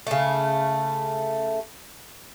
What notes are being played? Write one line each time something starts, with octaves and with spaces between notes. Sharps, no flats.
C#3 A3